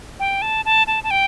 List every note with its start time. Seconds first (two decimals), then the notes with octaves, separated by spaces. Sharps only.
0.20 G5
0.42 A5
0.65 A5
0.87 A5
1.04 A5
1.11 G5